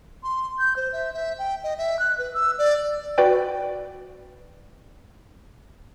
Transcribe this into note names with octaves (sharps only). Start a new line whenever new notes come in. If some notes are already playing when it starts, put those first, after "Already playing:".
C6
G6
C5
E5
E5
G5
D#5
E5
F#6
B4
E6
D5
F#4 B4 D5 G5